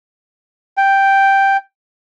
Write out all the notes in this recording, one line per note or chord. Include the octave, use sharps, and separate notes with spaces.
G5